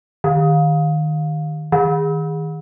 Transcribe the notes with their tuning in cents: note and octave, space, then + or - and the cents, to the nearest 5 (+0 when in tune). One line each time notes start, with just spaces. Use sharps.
D#3 -20
D#3 +20